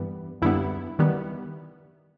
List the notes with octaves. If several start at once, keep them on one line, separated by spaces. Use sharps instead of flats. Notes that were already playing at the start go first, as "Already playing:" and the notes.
Already playing: G2 E3 G3 B3
F#2 D3 G3 B3 E4
D#3 G3 B3